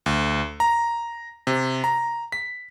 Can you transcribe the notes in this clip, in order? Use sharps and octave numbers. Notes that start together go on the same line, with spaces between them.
D2
A#5
C3
A#5
B6